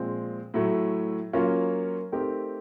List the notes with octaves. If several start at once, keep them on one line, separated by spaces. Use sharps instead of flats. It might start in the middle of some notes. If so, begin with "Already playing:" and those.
Already playing: A#2 F3 G#3 C4
A2 F#3 A3
F#3 A#3 C#4 F4
A3 C4 D#4 G4 A#4